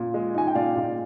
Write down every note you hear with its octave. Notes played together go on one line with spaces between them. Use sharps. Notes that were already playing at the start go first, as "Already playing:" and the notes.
Already playing: A#2
G#3
D#4 G#5
G5
A#2 D5 F5
A#2